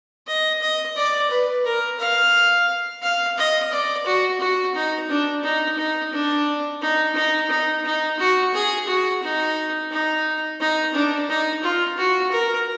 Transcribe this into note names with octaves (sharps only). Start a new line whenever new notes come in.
D#5
D#5
D5
B4
A#4
F5
F5
D#5
D5
F#4
F#4
D#4
D4
D#4
D#4
D4
D#4
D#4
D#4
D#4
F#4
G#4
F#4
D#4
D#4
D#4
D4
D#4
F4
F#4
A#4